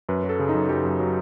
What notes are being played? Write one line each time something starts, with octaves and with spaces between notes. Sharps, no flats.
F#2 B4
F#3
A4
C#3
D#4
F#2
F#2 G4
F#2
F#3